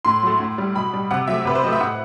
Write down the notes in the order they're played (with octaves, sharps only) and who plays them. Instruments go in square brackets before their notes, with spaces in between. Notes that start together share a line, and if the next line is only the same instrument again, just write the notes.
[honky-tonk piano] A2 C6
F#3 A3
A2
G3
B2 B5
G3
C3 F#5
F#3 A3 E5
C3 B4
C5
F#3 A3 D#5
E5
A2 F#5